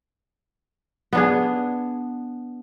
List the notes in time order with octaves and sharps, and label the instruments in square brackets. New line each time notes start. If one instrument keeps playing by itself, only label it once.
[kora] B3 D4 G#4